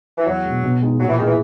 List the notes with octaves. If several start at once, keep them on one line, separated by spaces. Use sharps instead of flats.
E3
E2 F#3
B2 G#3
B2
G#3 D#4 G#4
A#2 F#3
E3
D#3 A#3 E4 G#4
E3